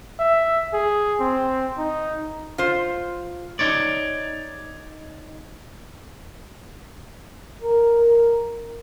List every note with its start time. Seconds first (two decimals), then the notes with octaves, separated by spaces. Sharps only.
0.20 E5
0.73 G#4
1.20 C4
1.78 D#4
2.58 F4 C5
3.59 D#4 C#5 D5
7.62 A#4